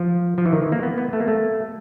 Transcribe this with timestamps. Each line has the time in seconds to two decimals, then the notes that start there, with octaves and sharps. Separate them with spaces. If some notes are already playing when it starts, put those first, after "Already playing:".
Already playing: F3
0.38 F3
0.46 E3
0.53 D#3
0.62 E3
0.72 A#3
0.83 B3
0.98 B3
1.13 A3
1.20 A#3
1.28 A3